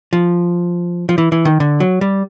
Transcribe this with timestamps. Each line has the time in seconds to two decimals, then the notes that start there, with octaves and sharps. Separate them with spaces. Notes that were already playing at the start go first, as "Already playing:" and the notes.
0.13 F3
1.09 F3
1.18 E3
1.32 E3
1.45 D#3
1.60 D3
1.80 F#3
2.01 G3